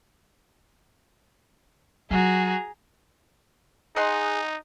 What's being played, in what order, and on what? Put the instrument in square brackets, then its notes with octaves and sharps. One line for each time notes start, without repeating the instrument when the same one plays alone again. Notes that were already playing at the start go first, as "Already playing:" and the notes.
[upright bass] F#3 F4 [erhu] F#4 [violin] G#4 A#5
[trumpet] D#4 [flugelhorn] G#4 [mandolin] D#5 F#5 C6